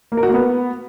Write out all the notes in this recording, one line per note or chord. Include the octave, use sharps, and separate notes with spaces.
A#3
A#4
F#4
A#3
B3